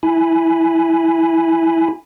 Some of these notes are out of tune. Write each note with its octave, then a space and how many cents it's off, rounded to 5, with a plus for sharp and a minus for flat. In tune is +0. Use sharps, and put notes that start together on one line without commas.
E4 +0 G#5 +0 B5 +0